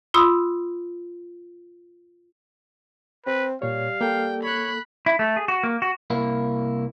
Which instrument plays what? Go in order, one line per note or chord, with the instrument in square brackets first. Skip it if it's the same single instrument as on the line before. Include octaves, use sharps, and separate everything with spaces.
[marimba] F4 B5 C6 D#6 E6
[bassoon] C4 [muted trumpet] B4
[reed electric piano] A#2 C#5 [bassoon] G3 [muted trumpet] F5
[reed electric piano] A#3 A4 [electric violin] G5
[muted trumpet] C#5 [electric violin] B5 F#6
[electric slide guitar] E4
A3
G#4
F#4
A#3
F#4
[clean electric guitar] C2 A#3 E4